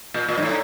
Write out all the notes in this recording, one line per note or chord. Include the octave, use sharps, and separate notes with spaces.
A#2
A#2
G2
A2